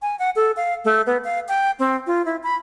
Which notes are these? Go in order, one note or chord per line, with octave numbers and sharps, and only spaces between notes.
G#5
F#5
A4
F5
A3
B3
F5
G5
C4
F4
E4
B5